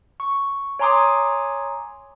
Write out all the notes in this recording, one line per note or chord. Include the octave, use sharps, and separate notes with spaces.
C#6
C#5 G#5 A#5 C6 D6 D#6